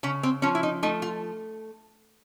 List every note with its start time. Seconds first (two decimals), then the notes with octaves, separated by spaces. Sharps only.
0.03 C#3 C#4
0.23 C4
0.42 F3 C#4
0.55 E4
0.63 D#4
0.83 A3 D#4
1.02 F4